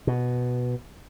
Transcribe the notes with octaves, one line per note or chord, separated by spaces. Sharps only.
B2